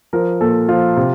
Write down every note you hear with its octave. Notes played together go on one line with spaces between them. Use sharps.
F3 A#4
A#2 A4
F3 F4
C3